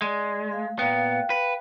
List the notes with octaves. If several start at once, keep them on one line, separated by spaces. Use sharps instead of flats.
G#3 D5
A3 F5
A#2 B3 F5 G5
B4